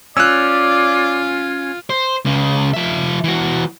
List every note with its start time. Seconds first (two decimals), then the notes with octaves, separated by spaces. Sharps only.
0.17 C#4 F4 D5 E6 F#6
1.90 C5
2.25 C#2 C#3
2.74 F3 E5
3.24 E3 F#4